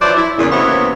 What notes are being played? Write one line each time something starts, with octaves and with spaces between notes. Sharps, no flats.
F3 F#3 E4 B4 C5 D5
E4
E2 A#2 C#3
F#2 C3 E3 A#3 B3 C#5